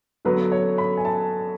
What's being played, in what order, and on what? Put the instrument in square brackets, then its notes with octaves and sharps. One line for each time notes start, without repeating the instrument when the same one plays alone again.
[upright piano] D3 F#3 B3 B4
C#5
B5
G#5
A5